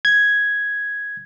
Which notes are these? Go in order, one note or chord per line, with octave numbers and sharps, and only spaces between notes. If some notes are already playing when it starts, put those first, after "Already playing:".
G#6